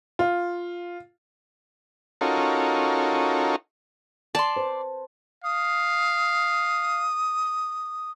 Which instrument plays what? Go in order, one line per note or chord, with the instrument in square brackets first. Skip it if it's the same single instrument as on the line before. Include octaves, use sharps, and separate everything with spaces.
[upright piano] F4
[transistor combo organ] C#4 D#4 F4 F#4 A4 A#4
[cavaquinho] D5 C6 [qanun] A5
[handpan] B4 C5
[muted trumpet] F5 [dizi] D#6